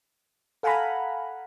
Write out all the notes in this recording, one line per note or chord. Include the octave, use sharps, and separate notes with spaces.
A4 F5 F#5 G#5 A#5 B5